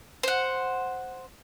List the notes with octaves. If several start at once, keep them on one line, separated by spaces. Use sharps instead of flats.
C5 F#5